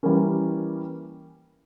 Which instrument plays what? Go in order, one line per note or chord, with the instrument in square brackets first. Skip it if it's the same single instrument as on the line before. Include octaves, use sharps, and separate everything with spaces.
[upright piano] E3 G3 A#3 C#4